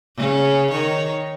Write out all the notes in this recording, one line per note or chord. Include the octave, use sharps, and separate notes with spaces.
C#3 C#4
D#3 C#5